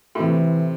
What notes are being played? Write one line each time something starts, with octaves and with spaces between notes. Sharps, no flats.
A2
C3 E3